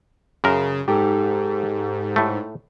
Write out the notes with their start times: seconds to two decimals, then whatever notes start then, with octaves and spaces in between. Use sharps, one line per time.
0.44 F#2 C#3 A#4
0.88 G#2 G4 A4
2.16 A2 A3